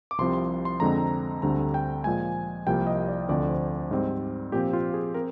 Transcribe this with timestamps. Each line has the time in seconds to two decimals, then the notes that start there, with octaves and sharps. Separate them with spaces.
0.11 D6
0.18 C2 C3 F3 C4 C6
0.33 C6
0.65 C6
0.80 F2 D3 G#3 C4 A#5
1.42 D2 D3 G3 C4 A#5
1.74 G5
2.04 A#2 F3 G#3 G#5
2.67 C2 C3 F3 A#3 G5
2.87 D#5
3.08 D5
3.29 D2 D3 F3 C4 D5
3.49 C5
3.91 G#2 G3 C4
4.52 A#2 F3 C4 G4
4.73 F4
4.94 G#4
5.14 C4 A#4